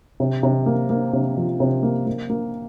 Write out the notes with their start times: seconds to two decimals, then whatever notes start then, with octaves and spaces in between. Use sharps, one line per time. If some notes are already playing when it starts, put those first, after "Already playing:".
0.20 C3
0.43 C3
0.66 A#3
0.90 A#3
1.13 C3
1.37 F3
1.60 C3
1.83 A#3
2.07 A#3
2.30 A#3